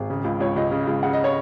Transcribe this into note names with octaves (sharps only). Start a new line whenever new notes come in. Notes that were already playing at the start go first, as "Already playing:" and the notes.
Already playing: G#1 G#4
C#3
C#2
C#2 C#5
C#2 D#5
C#3
C#2
C#3 F#5
D#5
C#5